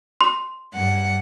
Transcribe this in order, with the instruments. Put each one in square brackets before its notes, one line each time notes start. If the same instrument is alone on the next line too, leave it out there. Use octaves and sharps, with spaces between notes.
[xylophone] C6
[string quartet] G2 F#5